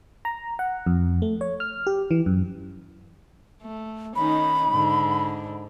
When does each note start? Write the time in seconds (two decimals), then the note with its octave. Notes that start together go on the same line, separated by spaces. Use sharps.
0.25 A#5
0.59 F#5
0.86 F2
1.22 A3
1.41 C#5
1.60 F6
1.87 G4
2.11 E3
2.26 F#2
3.62 A3
4.16 D#3 C#4 D#4 B5
4.71 G#2 D3